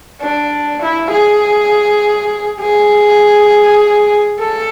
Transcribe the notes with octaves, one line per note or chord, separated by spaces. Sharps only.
D4
E4
G#4
G#4
A4